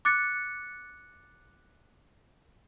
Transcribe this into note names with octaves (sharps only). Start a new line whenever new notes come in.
D6 F#6 A6 C#7